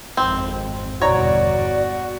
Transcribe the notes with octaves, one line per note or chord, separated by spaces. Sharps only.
G#1 F2 C4
G1 E2 B2 F#4 C#5 D5 A#5